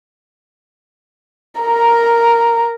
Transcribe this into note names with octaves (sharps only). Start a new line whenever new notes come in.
A#4 A#5